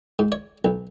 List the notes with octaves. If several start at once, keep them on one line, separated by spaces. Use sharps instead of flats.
G#2
C#5
B1